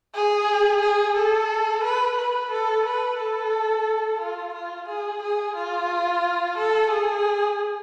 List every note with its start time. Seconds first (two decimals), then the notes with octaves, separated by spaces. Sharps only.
0.15 G#4
0.82 G#4
1.17 A4
1.84 B4
2.18 B4
2.51 A4
2.86 B4
3.19 A4
4.21 F4
4.54 F4
4.88 G#4
5.23 G#4
5.56 F4
6.58 A4
6.91 G#4